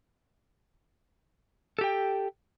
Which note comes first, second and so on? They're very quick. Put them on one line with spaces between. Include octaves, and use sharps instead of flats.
A4 G4 G5